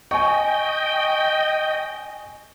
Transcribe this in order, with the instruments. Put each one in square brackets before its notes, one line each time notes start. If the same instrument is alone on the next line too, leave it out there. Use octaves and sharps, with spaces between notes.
[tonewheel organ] D#5 G5 [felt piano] G#5 C#6